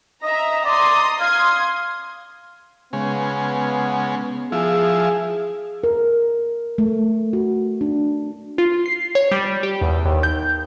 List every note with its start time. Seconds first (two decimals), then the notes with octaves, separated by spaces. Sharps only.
0.23 D#5 E5 A#5
0.65 D5 A#5 C6 D#6
1.21 F5 C6 D#6 G#6
2.93 C#3 G#3 B3
4.52 F3 E4 G#4
5.84 A#4
6.78 A3
7.33 F#4
7.81 D4
8.58 F4
8.86 C7
9.15 C#5
9.31 G3
9.63 G4
9.82 E2
10.05 D#2
10.23 G6